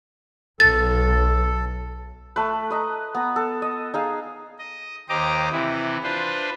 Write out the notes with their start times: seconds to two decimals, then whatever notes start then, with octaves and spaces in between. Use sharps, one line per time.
0.60 B1 A4 A6
2.36 A3 B4
2.70 B4 D#5 A#5
3.15 B3 A#5
3.36 A4
3.62 D#5
3.94 D#4 G#4 F5
4.59 D#5
5.09 D#2 G4 C5 D#5 A#5 D6
5.52 C3 E3 E4
6.04 D4 F4 B4 C5